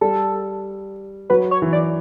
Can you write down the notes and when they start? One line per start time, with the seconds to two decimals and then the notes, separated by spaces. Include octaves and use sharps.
0.01 G3 A4
1.30 F#3 B4
1.51 C#5
1.62 E3
1.72 D5